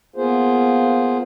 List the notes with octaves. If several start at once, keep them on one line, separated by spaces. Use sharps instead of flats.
A#3 B3 F4 G#4 C5